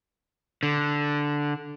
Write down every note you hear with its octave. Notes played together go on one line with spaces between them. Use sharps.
D3